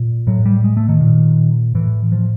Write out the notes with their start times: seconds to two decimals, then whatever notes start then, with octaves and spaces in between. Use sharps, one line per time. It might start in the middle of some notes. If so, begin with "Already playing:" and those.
Already playing: A#2
0.27 A2 F#3
0.46 G3
0.64 G#3
0.77 A3
0.89 D#3
1.01 A#2
1.75 A2 E3
2.12 F3